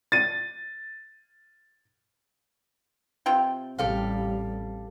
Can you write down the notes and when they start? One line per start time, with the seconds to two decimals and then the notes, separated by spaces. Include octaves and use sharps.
0.12 A6 D#7
3.26 C3 F4 G5
3.79 A1 G3 G4 A4 F5